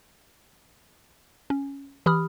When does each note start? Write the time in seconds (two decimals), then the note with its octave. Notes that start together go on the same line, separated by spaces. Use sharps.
1.50 C#4
2.06 E3 G4 B5 D#6 F6